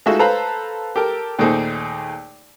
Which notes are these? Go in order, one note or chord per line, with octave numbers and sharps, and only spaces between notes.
G#3 A3 D#4 F4 F#4 E5
A4 B4 C5 F5 A#5 B5
G4 A4 A#4
D#2 A#2 A3 D#4 G#4 C5